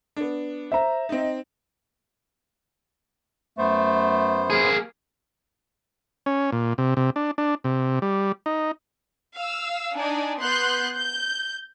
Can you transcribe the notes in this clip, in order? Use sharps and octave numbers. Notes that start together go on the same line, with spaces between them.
B3 D4
C5 E5 A#5
C4 D#4 D#5
F#2 A3 B3 C5
A#3 G#4
C#4
A#2
C3
C3
D4
D4
C3
G3
D#4
F5 E6
D4 D#4 D5 G#5
B3 C6 F#6 G6
G6